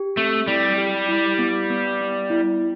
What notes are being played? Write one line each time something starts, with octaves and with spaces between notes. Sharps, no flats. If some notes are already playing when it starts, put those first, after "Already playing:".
Already playing: G4
A3 C4
G3 E4
G4
E4
B3
B3
B3
E4